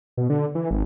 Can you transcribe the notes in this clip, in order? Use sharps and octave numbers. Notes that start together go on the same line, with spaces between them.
B2
D3
E3
G#1